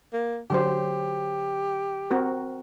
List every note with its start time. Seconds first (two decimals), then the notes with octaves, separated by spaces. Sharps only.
0.13 A#3
0.50 D3 F#3 G4 C5
2.10 C4 F#4 A#4